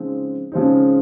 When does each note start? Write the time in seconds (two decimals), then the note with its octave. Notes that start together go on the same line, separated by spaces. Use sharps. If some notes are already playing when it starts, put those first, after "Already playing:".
Already playing: C#3 F3 G#3 C4 D#4
0.52 C#3 F3 G#3 C4 D#4